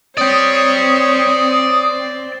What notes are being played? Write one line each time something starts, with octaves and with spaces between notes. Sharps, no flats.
C4 C#5 D5 G5 D#6